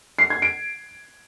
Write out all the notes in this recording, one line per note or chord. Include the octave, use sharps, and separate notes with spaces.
C7
G#6
D7